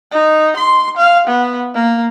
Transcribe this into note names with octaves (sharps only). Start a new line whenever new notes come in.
D#4
C6
F5
B3
A#3